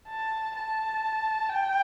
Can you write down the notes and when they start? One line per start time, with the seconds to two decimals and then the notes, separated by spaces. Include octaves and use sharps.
0.08 A5
0.55 A5
1.49 G5